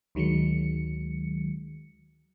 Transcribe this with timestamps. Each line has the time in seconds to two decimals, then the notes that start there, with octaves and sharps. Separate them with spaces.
0.15 D2 D#3 F#3 G#3 C#7